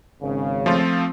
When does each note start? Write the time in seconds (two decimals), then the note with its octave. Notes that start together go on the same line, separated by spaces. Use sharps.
0.22 G#1 C#3
0.66 F3 A3 C4 F4